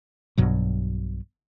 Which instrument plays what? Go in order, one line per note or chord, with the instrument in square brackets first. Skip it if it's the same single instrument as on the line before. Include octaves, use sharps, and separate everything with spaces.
[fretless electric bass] B1 G2 B2 F#3